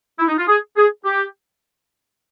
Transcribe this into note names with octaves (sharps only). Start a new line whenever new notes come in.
E4
D#4
F4
G#4
G#4
G4